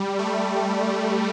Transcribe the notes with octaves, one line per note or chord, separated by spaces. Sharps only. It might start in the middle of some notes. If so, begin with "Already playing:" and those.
Already playing: G3
A3